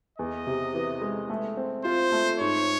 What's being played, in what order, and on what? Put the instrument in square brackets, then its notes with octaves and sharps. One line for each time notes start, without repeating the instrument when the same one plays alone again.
[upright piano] E2 [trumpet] D#5
[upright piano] C3
E3
G#3
A3
C4
[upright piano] F4 [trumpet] C5
[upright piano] A3
[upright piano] G#2 [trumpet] C#5